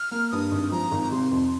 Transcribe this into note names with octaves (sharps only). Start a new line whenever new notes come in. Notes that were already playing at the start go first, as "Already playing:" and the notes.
Already playing: F6
A#3
G2 D#6
G#1
F3 A#5
G#1
C3 C6
F2